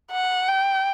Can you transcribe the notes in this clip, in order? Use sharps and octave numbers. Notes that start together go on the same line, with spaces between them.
F#5
G5